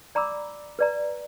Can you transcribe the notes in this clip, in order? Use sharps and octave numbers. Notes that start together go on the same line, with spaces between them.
D5 A#5 B5 D6 E6
B4 D5 A#5